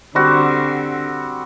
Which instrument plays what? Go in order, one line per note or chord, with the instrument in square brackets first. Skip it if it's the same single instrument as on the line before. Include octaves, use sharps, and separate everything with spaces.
[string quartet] D3 [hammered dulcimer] G3 C4 F#4